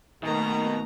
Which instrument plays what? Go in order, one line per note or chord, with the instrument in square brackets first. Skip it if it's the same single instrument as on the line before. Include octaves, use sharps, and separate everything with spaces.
[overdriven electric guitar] B2 [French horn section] D#3 [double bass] A3 D#4 [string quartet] A#3 A#5